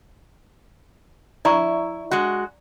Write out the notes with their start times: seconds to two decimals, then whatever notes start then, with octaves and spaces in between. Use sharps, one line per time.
1.45 E4 D5 A#5 C#6
2.11 G#3 F#4